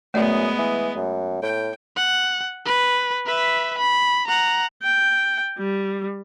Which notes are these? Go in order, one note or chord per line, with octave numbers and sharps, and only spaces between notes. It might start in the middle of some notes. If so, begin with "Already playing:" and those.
F#2 G#3 A3 B3 D5
E3
F#2
A2 G5
F#5
B4
B4 E5
B5
F#5 A#5
G5
G3